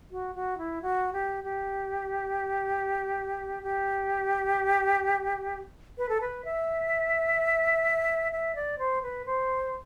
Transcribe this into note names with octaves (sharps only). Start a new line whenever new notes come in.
F#4
F#4
E4
F#4
G4
G4
G4
B4
A4
B4
E5
E5
D5
C5
B4
C5